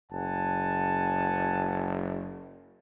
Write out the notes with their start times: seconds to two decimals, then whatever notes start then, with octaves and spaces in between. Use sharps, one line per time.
0.12 F#1 F#5 G#5 A5